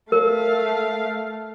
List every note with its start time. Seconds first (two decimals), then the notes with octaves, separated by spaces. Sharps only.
0.12 A3 A#4 F5